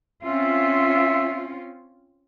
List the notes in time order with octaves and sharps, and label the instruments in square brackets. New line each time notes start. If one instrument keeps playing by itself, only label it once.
[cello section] C4 C#4 F4 [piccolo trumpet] E5